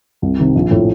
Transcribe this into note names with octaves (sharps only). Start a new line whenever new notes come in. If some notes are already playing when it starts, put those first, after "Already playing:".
C2
C3 D#3
A#1
A2 F3